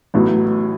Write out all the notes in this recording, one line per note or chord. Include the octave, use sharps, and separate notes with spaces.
A1 A2 F#3 B3